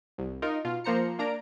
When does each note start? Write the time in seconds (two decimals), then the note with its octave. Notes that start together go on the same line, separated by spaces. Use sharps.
0.18 C2
0.42 D#4 F4 A#4
0.65 B2 F4
0.84 F3 A#3 C5 A#5 C#7
1.19 A#3 D4 A#5 D7